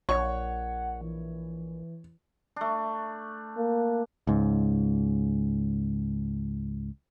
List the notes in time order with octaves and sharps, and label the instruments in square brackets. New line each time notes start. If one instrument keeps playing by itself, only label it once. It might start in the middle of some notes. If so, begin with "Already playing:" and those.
[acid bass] A#1 [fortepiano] C#5 C#6 [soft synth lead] F#5
[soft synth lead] E3
[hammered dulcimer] A3 D4
[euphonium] A#3
[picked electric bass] C#2 G#2